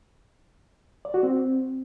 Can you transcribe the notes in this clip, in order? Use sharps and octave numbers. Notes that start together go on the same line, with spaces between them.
D5
F#4
C4